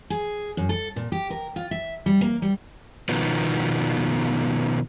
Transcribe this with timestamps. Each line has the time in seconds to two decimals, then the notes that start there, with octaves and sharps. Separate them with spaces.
0.10 G#4
0.57 F#2
0.69 A4
0.96 A#2
1.12 G4
1.30 A#4
1.56 F4
1.71 E5
2.06 G3
2.21 A#3
2.42 G3
3.09 B2 D#3 F3 B3